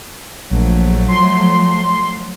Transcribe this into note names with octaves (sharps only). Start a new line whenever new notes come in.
A#1 F3 F#3 A3
C6